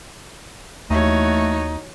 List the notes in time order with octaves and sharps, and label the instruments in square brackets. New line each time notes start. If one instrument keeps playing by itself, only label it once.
[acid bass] D#2 [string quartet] E3 F#4 C#5 [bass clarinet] A3 [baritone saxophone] D#4